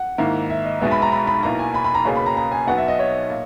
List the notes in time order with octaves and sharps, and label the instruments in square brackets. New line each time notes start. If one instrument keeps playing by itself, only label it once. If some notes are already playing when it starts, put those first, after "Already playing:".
Already playing: [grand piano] F#5
[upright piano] G#2 D#3 A#3 E4
[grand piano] E5
D#5
[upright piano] B1 B2 G#3 B3 [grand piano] E5
[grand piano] B5
A#5
B5
B5
[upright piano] B1 B2 A#3 E4 [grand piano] A#5
[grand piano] G#5
B5
B5
A#5
[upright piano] C#2 B2 A#3 C#4 G#4
[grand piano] B5
A#5
A#5
G#5
[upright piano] B1 B2 F#3 B3 [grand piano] F#5
[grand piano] E5
D#5
C#5
[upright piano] A#2